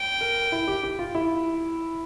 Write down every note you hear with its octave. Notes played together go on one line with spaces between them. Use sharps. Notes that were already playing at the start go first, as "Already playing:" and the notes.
Already playing: G5
A#4
E4
G4
G4
F4
E4